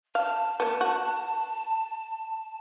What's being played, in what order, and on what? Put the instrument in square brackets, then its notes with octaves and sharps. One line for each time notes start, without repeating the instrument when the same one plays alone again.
[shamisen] F5 [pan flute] A5
[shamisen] A#3 B3
F#4